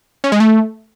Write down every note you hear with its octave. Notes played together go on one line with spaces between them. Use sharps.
C#4
G#3
A3